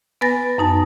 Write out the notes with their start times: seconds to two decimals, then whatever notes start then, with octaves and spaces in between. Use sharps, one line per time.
0.21 B3 B4 G#5 A6 A#6
0.58 F#2 D#4 A5